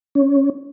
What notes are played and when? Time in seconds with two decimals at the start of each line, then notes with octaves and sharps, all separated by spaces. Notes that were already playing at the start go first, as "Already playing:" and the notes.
0.15 C#4